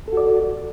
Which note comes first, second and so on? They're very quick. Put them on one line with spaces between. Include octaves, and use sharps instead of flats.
A4 F#4 D5